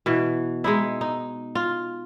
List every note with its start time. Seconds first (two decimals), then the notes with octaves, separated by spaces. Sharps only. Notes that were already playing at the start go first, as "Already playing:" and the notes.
0.06 B2 E3
0.64 G#3 D#4 E4
1.01 D#4
1.55 F4